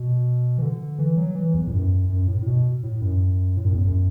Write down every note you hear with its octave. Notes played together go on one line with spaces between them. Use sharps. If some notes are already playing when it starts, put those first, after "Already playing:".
Already playing: B2
E3
D3
E3
F#3
E3
E2
A2
F#2
F#2
A2
A2
B2
A2
F#2
A2
F#2
E2
F#2